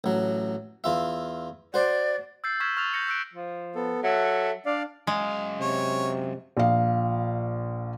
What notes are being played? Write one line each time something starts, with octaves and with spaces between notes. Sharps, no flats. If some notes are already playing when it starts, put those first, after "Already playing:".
A1 F#3
E2 F4 E5
F#4 C5 D5
E6 G6 A6 C7
C#6 E6 F6 G#6 B6 E7
C#6 F6 F#6 A6 F7
G6 A#6 C#7
E6 F#6 D7
F3
B3 A4
F#3 A4 E5 F#5
D4 D5 F5
F#2 G#3 F5
C3 C#5
A#1 F5